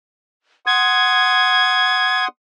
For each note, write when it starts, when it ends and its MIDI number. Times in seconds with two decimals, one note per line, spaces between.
0.66 2.28 78
0.66 2.28 84
0.66 2.28 87
0.66 2.24 92